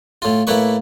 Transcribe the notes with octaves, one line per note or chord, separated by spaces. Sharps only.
A2 F4
A2 A#3 E4 B4 C#6